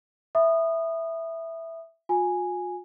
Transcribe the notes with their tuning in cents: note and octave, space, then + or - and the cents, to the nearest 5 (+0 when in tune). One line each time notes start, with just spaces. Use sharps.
E5 +0 B5 +0 D#6 -20
F4 +45 G#5 +0